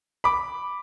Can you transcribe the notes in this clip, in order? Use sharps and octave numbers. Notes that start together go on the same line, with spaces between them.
B5 D6